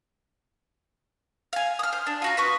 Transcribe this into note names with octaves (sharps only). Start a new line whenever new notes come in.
F5 G#5
D#6 F6
C5
D4
F4 F#4 A#5
B4 C#6 D#6